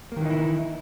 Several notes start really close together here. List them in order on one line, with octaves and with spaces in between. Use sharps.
A#3 D#3 E3 D#4 E4